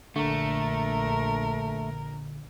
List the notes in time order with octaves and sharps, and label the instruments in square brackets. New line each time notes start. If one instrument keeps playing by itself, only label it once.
[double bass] A#1 [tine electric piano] D3 [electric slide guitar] A3 [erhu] A#4